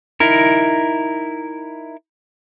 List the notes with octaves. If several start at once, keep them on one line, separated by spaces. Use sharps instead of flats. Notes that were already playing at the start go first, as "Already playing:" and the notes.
D#4 E4 A#4